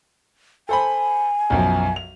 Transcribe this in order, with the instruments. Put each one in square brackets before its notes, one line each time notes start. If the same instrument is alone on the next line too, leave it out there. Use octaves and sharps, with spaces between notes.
[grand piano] A4 C5 B5 [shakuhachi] G#5
[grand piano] B1 F#2 F3
F7